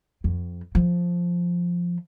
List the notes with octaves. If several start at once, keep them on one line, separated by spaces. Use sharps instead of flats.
F2
F3